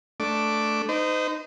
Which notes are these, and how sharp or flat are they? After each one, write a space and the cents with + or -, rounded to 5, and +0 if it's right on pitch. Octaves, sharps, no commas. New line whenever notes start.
A3 +0 D4 +0 D6 +0
D#4 -10 C5 -40